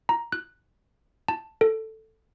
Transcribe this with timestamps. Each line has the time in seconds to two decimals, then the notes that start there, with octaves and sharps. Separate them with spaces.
0.09 A#5
0.32 F#6
1.28 A5
1.61 A4